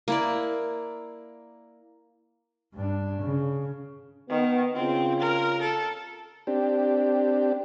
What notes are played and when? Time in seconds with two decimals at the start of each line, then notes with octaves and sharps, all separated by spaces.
0.08 A#3 E4 D5
2.74 G2 D4
3.21 C#3
4.30 D#3 B3
4.75 C#3 C4 F4
5.20 A#4
5.62 A4
6.47 C4 D4 G4